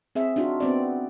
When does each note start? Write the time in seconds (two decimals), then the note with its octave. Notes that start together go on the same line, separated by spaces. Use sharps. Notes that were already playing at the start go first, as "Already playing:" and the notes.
0.15 C4 G#4 E5
0.36 D4 D#4 F4 F#4
0.60 B3 C4 D5